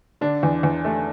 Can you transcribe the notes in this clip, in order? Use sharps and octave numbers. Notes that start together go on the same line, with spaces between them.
D3 D4
E2
E2
A3